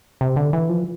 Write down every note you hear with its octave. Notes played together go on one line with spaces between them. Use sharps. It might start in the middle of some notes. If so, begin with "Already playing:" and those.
C3
D3
E3
F3